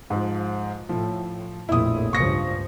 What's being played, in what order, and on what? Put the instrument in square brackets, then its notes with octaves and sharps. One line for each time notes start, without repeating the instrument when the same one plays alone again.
[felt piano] G#2 [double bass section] F3
[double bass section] A2 [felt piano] F3
[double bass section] A#1 F2 A2 [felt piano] E4 D#6
[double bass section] C#2 G2 F3 [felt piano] C#6 A#6 C#7